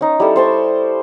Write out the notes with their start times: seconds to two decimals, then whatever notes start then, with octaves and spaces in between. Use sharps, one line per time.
0.01 C#4 D#4
0.20 G3 E4 A4
0.36 C5 G5 A5 C#6